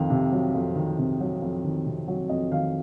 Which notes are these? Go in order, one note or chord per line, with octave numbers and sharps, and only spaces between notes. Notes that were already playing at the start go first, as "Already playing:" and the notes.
Already playing: F2 D#3 F5
C3
F#3
F2
D#3
C3
F#3
F2
D#3
C3
F#3
F2 D#5
D#3 F5